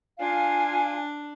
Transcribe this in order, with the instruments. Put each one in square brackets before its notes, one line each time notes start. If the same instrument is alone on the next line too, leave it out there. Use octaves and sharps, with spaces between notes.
[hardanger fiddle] D4 [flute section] F4 F5 G#5